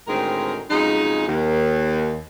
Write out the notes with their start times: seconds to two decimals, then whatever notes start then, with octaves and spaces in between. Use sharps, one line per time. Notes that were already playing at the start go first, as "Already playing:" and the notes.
0.08 D2 A2 D#3 G#3 C4 A#4
0.71 F2 C#3 F#3 G#3 D#4
1.27 D#2